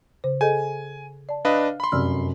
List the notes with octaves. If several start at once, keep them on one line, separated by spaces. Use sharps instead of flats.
C#3 C5
G#4 A4 D#5 G#5
D5 A5
D4 B4 D#5 F5
B5 C6
F1 F#2 D5 E6 F6